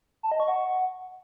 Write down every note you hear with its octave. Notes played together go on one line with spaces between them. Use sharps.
A5
D#5
C#6
F#5